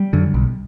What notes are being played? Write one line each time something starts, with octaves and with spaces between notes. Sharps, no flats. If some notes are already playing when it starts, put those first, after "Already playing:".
Already playing: G3
F#2 D3
B1